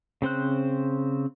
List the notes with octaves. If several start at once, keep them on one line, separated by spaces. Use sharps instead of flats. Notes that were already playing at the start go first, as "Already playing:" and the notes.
C#3 C4 C5 F#6